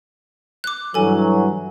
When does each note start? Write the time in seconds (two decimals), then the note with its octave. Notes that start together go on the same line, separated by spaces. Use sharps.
0.64 D6 F#6
0.94 G2 E3 F#3 A4 G#5